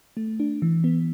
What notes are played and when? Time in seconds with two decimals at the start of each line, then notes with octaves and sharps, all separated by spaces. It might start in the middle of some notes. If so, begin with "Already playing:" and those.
0.17 A3
0.40 D4
0.62 E3
0.84 B3